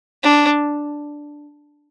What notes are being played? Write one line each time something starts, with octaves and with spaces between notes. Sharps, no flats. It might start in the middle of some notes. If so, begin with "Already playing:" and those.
D4